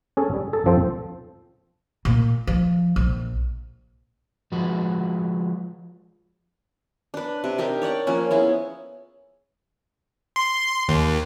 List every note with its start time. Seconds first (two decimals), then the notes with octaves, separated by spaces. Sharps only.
0.17 C#4 G#4 A4
0.34 G3
0.53 G#4 A4 A5
0.66 F2 F3 C4 A4 C5
2.05 A#2
2.47 F3
2.96 A#1
4.52 F3 G#3 F#4 B4
7.14 D4 B4
7.44 C3
7.58 D4 D#4 G4 A#4
7.82 C#5 D5 F#5 C#6
8.07 F3 A#3 C#4
8.31 B3 E4 G#4
10.36 C6
10.88 D#2